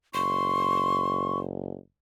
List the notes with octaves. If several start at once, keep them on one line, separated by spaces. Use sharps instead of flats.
F#1 C6 C#6